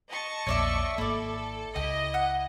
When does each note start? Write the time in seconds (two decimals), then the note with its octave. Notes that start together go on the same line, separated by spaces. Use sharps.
0.11 D#5 A5 C#6
0.47 A#1 E2 A#3 C#5 D5 E5
0.98 G#1 A#3 E4 A4 D5
1.76 C#2 E4 G4 D#5
2.14 F#5